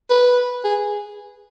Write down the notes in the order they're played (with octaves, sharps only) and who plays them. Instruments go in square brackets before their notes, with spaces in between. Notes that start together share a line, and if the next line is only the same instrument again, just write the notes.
[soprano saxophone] B4
G#4